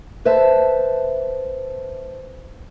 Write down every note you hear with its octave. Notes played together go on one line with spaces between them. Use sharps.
B4 C5 E5 A5